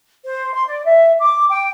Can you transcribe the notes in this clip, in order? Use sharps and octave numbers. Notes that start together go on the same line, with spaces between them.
C5
C6
D5
E5
D6
G5